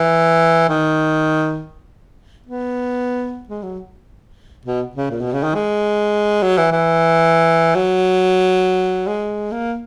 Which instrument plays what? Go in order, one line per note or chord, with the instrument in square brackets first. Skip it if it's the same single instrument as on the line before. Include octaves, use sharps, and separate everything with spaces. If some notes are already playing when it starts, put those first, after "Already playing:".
Already playing: [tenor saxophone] E3
D#3
B3
G#3
F#3
B2
C#3
A#2
B2
C#3
D#3
G#3
F#3
E3
E3
F#3
G#3
A#3